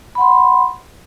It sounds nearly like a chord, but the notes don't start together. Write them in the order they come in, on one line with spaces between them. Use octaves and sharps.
B5 F#5 C6